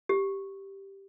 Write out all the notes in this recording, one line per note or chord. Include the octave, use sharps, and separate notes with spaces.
G4